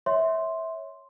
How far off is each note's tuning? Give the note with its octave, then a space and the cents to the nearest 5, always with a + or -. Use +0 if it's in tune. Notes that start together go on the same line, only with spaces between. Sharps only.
C#5 +0 E5 -15 C6 +0